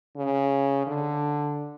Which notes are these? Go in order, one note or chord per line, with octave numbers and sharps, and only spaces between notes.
C#3
D3